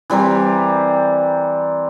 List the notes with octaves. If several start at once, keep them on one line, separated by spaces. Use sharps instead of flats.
E3 G3 C4 A#4